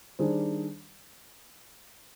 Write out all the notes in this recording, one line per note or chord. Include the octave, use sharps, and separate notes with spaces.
D#3 G3 D4 G#4 C5